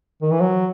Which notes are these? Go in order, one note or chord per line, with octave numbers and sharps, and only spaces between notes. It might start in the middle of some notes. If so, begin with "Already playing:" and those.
D#3
E3
F#3